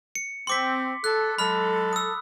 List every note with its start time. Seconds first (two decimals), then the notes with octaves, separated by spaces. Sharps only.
0.15 C#7
0.47 C4 C6 D6 B6
1.04 A4 F#6
1.38 F#3 G#3 A4 B5 F6
1.93 D#6 E6